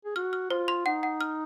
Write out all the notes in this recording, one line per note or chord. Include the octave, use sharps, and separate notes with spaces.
G#4
F#4 F6
F6
F4 C5
C6
D#4 F#5
F#5
F6